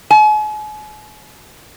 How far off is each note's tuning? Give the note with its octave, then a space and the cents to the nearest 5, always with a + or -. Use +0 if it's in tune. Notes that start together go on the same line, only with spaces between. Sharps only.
G#5 +40